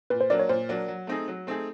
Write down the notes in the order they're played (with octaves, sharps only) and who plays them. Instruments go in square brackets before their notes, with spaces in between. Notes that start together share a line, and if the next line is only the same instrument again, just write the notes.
[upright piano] A#2 [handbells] B4
[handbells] C5
[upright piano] F#3 A#3 D4 [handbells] D5
[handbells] C#5
[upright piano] A#2 [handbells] C5
[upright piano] F#3 A#3 D4
F#3
A3 C4 D#4 G#4
F#3
A3 C4 D#4 G#4